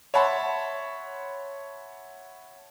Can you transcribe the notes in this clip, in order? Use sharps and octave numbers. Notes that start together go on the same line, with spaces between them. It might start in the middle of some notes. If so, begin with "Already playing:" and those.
C#5 E5 F#5 A5 B5 C6